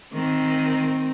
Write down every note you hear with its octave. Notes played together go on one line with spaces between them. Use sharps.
D#3 C4